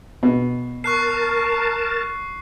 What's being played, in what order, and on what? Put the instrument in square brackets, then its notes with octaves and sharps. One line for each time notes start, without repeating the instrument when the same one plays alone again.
[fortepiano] B2
[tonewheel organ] A#4 A5 [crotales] C#6 F#6 C7